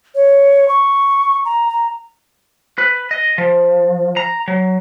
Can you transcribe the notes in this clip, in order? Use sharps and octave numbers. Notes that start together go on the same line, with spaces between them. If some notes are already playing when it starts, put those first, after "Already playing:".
C#5
C#6
A#5
A#5
B4
D#5
F3
A#5
F#3